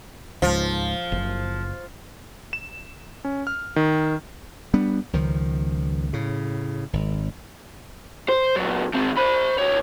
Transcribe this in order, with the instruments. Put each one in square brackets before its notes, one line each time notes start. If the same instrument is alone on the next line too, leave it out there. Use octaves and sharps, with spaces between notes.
[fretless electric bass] C#2 G#2 [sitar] F3
[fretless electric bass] F#1
[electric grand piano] E7
C#4
F6
D#3
[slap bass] G3 B3 D4
C#2 D#3 F3
A2 C#3
G#1
[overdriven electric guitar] C5
A#2 F#3
D#3 C4
C5 B5
D2 C#5